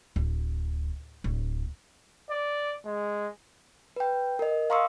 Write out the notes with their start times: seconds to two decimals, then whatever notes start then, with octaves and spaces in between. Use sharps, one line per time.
0.16 D1
1.24 D1
2.31 D5
2.86 G#3
3.96 B4 G5
4.39 A#4 D#5
4.70 F5 A#5 C6 C#6 D#6 E6